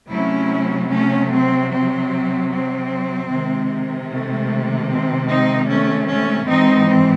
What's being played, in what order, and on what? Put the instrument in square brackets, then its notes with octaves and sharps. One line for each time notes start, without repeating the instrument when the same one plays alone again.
[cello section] C3 F#3 A3 C#4 E4
A3 C#4
C4
C4
C4
C3 D#3 G#3
A3
C4
C4 D#4
A3 C#4
A3 C#4
G#2 E3 G#3 C4 D#4
C4